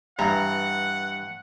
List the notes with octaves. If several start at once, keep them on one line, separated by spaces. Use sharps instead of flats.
G2 E3 F#5 A#5